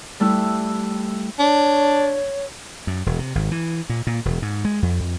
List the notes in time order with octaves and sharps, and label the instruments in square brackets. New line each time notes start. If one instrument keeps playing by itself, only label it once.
[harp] G3 A3 E4 F#6
[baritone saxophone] D4 [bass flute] C#5
[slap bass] F#2
E1
C3
G#1
E3
A#2
A#2
E1
G#2
G#3
F2
F2